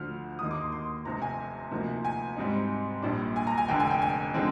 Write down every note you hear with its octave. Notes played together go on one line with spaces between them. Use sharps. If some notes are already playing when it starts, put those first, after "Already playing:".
Already playing: D2 D3 F3 F6
D#2 D#3 A#3 D#4 D#6
D6
C6
C6
F1 F2 C3 A#5
G#5
D2 C3 F3 A#3 D#4
G#5
G#2 G3 C4 D#4
A#1 A#2 G3 D4
G#5
A#5
G#5
F1 F2 D3 G5
G#5
G5
G#5
D3 F3 G#3 C4